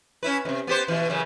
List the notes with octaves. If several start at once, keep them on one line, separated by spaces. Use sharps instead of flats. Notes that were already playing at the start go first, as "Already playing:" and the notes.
C#4 E4 B4
E2 C3
B3 G4 C5
B2 E3
F#2 C#3 E3